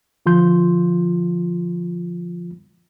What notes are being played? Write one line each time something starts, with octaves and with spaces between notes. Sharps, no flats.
D3 F3 F4 C6 G6